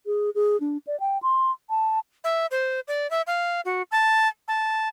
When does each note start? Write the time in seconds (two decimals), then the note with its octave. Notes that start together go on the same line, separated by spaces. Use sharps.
0.06 G#4
0.35 G#4
0.60 D4
0.87 D5
1.00 G5
1.23 C6
1.70 A5
2.24 E5
2.51 C5
2.88 D5
3.11 E5
3.27 F5
3.65 F#4
3.91 A5
4.48 A5